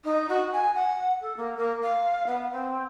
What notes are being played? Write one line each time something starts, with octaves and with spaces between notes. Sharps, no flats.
D#4
F#4
G#5
F#5
A4
A#3
A#3
F5
B3
C4